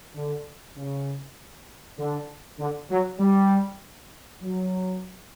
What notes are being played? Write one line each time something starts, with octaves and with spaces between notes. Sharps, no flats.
D3
C#3
D3
D3
F#3
G3
F#3